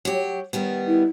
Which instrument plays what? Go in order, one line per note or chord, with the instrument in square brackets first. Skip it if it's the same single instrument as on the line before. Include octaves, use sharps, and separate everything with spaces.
[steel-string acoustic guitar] F#3 G4
D#3 G3 B3
[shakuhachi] E4